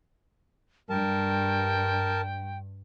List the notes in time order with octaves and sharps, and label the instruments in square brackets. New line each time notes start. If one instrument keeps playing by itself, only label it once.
[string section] G2 [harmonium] A#4 A5 [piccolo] G5